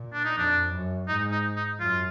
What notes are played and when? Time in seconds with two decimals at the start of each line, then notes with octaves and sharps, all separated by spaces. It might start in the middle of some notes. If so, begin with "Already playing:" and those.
Already playing: A#2
0.13 D4
0.25 D#4
0.37 F2 D4
0.73 F#2
1.08 G#2 D#4
1.31 D#4
1.56 D#4
1.80 F#2 F4